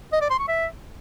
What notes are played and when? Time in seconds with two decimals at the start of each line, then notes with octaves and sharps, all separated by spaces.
0.12 D#5
0.21 D5
0.30 C6
0.39 C#6
0.48 E5